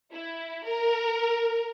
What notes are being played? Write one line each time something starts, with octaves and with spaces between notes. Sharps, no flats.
E4
A#4